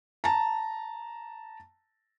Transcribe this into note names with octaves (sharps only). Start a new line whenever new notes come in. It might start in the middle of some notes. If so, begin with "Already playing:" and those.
A5 A#5